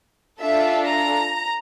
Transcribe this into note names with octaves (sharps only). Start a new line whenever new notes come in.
D4 F4 A4 E5
A#5